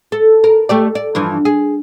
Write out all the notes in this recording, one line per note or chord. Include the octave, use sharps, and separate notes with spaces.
A4
A#4
A3 G4 D5
D5
G2 E3 F3
G#4